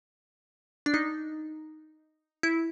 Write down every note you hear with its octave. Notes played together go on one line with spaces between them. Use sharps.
D4
D#4
E4